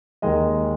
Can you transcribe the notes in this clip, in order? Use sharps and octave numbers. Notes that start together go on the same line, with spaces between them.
D#2 D#3 G#3 D#5